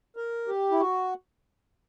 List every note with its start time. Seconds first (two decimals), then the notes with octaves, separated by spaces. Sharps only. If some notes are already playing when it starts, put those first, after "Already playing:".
0.16 A#4
0.48 G4
0.71 E4
0.80 F#4